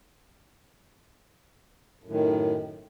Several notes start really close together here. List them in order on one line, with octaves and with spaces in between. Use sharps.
F#2 A2 D#3